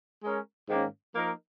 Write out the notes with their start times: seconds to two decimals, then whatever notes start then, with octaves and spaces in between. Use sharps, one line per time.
0.22 G#3 C#4 A#4
0.68 G#2 D#3 A#3 C#4
1.15 F3 A#3 D#4 A#4